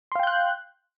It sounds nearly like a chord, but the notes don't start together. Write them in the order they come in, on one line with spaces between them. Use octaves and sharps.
C6 F5 G5 G6 F#6